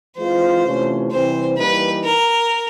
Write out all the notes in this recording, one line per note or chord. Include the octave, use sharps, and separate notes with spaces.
E3 G#3 C4 F4 C5
C3 E3 A3 C#4 F4
C3 E3 G3 C4 C5
E3 G3 A#3 D#4 B4
A#4